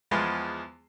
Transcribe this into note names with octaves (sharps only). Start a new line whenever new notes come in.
E2 F3 G#3 B3 B4 C6